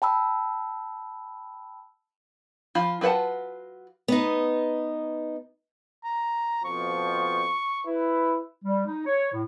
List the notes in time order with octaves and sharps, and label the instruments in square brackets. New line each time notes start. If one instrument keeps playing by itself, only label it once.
[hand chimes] G5 A5 B5 E6
[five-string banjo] F3 F4 B5
F#3 F4 B4 F#5 A5
[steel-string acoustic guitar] B3 D#4
[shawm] A#5
[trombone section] F2 B2 F3 [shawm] C#6
[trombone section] E4 B4
[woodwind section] G3
D#4
C#5
A2